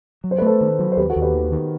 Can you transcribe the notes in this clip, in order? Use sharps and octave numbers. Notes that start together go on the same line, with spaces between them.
F#3
C5
B4
A3 A4 C5
D#3
F#3
C5
D#2 G4 B4
F#4 A4
D#2
G4 B4
D#3
D#3